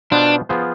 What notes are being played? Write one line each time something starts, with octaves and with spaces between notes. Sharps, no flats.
B2 B3 D4 F4 C5
F3 B3 F4 G#4 C5